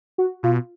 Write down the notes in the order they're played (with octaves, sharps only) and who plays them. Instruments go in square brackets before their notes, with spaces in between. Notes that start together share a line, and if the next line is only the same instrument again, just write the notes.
[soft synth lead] F#4
[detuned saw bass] B2 [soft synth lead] F4